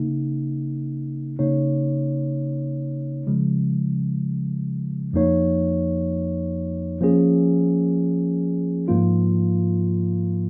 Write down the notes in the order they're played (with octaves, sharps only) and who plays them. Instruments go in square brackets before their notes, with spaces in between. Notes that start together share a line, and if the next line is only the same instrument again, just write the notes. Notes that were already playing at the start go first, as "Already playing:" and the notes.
Already playing: [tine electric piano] C#3 A#3 D#4
C#3 A#3 D#4 C#5
C#3 F3 G#3
F2 F3 A#3 D#4 C#5
F3 A#3 C#4 G#4
G#2 F3 A#3 F4